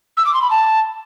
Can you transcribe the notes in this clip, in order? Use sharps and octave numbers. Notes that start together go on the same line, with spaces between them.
E6
D6
C6
B5
A5